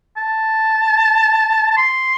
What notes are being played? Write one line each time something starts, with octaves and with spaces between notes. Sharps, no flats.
A5
A5
C6